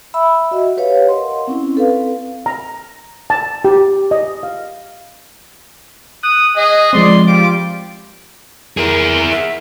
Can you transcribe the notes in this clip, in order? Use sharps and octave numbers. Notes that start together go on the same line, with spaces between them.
E5 B5 E6
F#4 D#5 E5 F#5
G4 B4 C#5 F5
A#4 D#5 F#5 C6
C4 C#4 E4
C4 A4 B4 F5
A#5
A5
G4
D#5
F5
D#6 F#6
G#4 D#5
F3 G#3 C4 D5 C6
G3 F4 D6
E4 G#4 A#4
E5